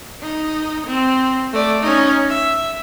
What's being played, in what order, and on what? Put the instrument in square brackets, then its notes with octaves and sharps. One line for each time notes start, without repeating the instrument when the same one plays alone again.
[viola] D#4
C4
A3 D5
C#4 D#4
E5